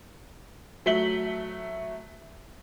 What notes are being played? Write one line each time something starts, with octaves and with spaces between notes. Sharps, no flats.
F#3 A3 B6 F#7 G7